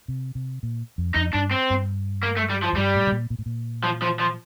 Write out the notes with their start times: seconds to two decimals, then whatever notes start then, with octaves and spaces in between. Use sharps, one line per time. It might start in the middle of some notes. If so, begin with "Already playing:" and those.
0.08 C3
0.35 C3
0.63 A#2
0.98 F2
1.15 F2 D#4
1.34 G2 D4
1.51 C4
1.70 G2
2.23 A#3
2.37 A3
2.50 G3
2.63 F3
2.73 F2
2.76 G2 G3
2.95 A2
3.07 C3
3.12 A#2
3.30 A#2
3.39 A2
3.46 A#2
3.83 F3
4.02 F3
4.19 F3